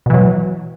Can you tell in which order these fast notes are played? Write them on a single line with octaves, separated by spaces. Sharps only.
B2 E3 F#3